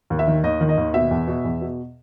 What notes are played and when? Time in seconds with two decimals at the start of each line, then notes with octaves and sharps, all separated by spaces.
0.10 D#2
0.19 E5
0.27 D#3
0.44 D#2 D#5
0.61 D#3
0.69 D#5
0.77 D#2
0.94 B2 E5
1.11 E2
1.27 B2
1.44 E2
1.61 B2